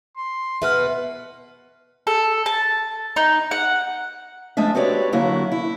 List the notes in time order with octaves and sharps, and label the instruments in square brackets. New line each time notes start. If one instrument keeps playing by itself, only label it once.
[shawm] C6
[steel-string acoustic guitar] B2 B4 F#5 [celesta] E5 F6
[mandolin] A4
A5
D#4
F#5
[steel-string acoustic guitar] F3 G#3 A3 D4 E5
C4 F#4 G4 B4 C#5 D5
D3 F#3 A#3 E4 F#4
E4